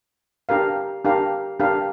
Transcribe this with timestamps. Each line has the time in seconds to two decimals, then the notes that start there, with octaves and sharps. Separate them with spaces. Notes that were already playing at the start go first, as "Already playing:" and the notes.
0.49 D4 G4 A#4 F5
1.05 D4 G4 A#4 F5
1.60 D4 G4 A#4 F5